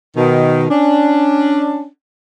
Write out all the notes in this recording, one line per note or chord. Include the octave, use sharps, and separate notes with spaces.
B2 D#3
C#4 D4